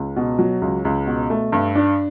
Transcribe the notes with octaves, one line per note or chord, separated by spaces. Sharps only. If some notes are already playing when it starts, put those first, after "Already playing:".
Already playing: C#2
B2
F#3
C#2
C#2
B2
A3
G2
D4